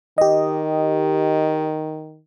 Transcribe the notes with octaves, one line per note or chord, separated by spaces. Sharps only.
D#3 G4 D#5